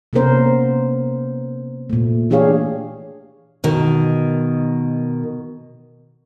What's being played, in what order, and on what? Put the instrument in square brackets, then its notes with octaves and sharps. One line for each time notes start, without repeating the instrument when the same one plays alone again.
[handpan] C3 A#3 B3 C#4 A#4 C5
A#2 A3
E3 D4 G4 G#4 C#5 F5
[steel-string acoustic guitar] B2 D#3